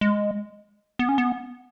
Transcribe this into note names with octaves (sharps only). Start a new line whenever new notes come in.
G#3
B3
C#4
B3